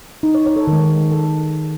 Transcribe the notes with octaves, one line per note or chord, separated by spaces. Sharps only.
D#4
C#5
C#5
A4
D#3 G#3
A4